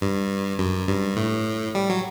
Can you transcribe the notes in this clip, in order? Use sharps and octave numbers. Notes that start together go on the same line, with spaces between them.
G2
F#2
G2
A2
G3
F#3